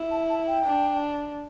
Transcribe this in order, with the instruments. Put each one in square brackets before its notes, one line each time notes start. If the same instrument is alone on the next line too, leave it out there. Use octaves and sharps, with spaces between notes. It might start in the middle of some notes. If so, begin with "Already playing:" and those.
Already playing: [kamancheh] E4
[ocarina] A5
A5
G5
[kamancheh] D4